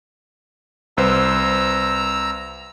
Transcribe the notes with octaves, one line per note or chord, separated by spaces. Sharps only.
C2 B4 C5 A#5 E6